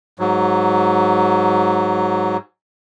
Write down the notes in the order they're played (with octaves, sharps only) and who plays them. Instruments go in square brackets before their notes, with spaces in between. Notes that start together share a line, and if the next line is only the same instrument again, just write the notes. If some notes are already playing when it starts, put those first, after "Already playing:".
[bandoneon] G#2 F#3